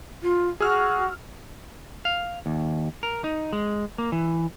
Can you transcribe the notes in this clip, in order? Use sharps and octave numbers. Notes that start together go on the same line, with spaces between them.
F4
F#4 G#4 E6 F6
F5
D#2
A#4
D#4
G#3
A#3
E3